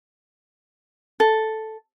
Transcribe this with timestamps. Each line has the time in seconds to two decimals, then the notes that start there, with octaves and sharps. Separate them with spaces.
1.20 A4